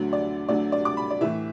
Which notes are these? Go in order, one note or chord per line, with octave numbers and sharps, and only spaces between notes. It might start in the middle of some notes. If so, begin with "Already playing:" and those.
Already playing: D2 D3 F#3
D5
D2 D3 F#3 D5
D5
D6
B5
D5
A2 E3 E5